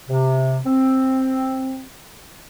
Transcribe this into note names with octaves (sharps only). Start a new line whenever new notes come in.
C3
C4